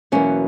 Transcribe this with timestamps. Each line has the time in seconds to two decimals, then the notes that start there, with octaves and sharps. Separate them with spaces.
0.12 E2 B2 F#3 A#3 C#4